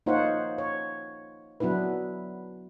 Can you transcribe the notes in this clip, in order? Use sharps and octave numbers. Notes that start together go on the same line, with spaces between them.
A#3 D#4 F4 C5 C#5 F#5
C#5
F#3 B3 D4 E4 B4